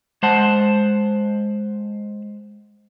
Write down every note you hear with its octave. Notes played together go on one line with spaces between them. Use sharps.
G#3 C5 F#5 A5